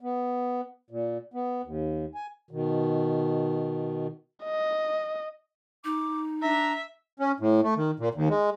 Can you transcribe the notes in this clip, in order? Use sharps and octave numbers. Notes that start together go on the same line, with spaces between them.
B3
A#2
B3
D#2
G#5
B2 D#3
D#5
D#4 D6
D4 E5 A#5
C#4
A2
A3
D#3
A#2
D#2
G#3